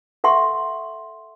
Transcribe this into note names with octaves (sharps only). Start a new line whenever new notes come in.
A4 E5 F#5 C6 C#6